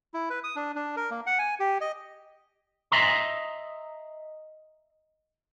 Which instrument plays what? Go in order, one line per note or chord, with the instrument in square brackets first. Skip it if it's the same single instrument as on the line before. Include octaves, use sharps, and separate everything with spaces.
[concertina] E4
B4
D#6
D4
D4
A#4
A#3
F#5
G#5
G4
D#5
[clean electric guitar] D#5 E5 A#5 C6